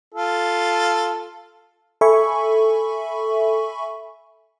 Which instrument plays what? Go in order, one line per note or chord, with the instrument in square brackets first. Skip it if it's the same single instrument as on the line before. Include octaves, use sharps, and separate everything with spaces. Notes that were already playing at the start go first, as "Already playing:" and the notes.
[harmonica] F4 A4
[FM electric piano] A4 E5 G#5 B5 C#6